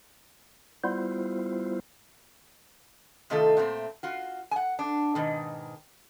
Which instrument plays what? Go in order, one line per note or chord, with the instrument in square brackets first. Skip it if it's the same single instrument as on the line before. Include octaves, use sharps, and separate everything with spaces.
[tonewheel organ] G3 B3 E4 F4 C5
[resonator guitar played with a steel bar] C3 D#3 A3 D#4 F4 A4
A#2 A3 C4
F4 F#4
F#5 G#5
D4
G#2 B2 D#3